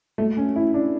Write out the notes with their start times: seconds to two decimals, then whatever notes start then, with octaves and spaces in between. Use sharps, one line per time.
0.18 A3
0.37 C#4
0.56 E4
0.74 D4